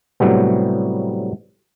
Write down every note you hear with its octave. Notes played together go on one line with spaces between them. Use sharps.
A2 C3 F#3 G3 B3